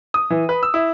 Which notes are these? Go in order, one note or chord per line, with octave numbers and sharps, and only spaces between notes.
D#6
E3
B4
E6
E4